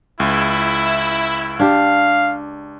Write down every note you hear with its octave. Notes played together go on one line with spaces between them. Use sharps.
C#2 E4
D4 G4 F5